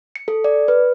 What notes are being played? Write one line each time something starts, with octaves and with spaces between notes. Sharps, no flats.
C#7
A4
D5
B4